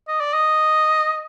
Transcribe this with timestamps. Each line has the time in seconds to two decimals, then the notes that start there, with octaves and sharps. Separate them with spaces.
0.08 D#5
0.21 D5
0.33 D#5